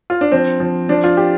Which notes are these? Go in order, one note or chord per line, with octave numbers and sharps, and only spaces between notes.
F4
D4
F3 C4
F3
F3 D4
F4
G4